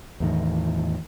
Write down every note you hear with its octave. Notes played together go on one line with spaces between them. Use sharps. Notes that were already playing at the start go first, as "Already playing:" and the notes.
E2 A2 D#3